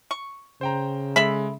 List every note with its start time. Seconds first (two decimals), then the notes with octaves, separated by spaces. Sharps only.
0.11 C#6
0.61 C#3 C5 G5 A#5
1.16 G#3 A4 E5 B5